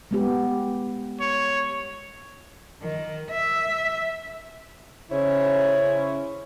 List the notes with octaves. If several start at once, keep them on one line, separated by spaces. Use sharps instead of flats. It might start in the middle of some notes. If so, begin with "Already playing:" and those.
G#3 B3 G4
C#5
D#3
E5
C#3 C#4 E4 C5 C#5